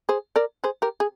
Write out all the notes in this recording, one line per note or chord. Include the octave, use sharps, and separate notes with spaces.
G#4 C5
A#4 D5
G#4 C5
G4 A#4
G#4